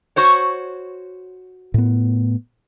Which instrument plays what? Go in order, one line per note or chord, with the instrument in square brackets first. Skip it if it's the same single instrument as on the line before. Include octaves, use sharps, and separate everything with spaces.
[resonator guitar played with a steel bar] F#4 C5 C#5
[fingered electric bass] A2 B3